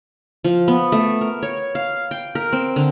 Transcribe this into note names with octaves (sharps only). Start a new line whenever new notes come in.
F3
B3
A3
A#4
C#5
F5
G5
A#4
C4
D3